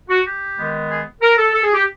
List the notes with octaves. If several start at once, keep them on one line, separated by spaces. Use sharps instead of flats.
F#4
G4
D#3 G#3 B3
G#4
A#4
A4
A4
G#4
G4